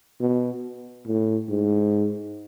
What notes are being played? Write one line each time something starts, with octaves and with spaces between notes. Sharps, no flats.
B2
A2
G#2